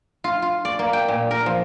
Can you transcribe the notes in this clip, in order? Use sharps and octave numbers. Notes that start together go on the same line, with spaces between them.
F4
F4
D5
A#3
G5
A#2
A#4
F3